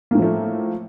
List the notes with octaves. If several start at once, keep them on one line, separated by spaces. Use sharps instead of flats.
A2 F3 A3 A#3